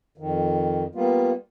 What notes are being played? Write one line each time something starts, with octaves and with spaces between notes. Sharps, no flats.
F2 D#3
G3 A#3 B3 F4